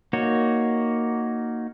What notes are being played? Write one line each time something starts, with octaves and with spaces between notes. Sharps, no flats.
A#3 D#4 F#4 C#5